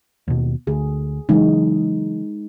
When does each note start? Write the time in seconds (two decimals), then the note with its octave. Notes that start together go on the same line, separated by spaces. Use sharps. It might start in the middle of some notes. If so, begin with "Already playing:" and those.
0.28 D#2 B2
0.67 D2 G#4
1.29 C#3 E3 F#3 G#3 D#4